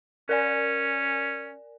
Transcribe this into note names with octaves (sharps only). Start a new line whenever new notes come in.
C#4 A#4 D5 G#5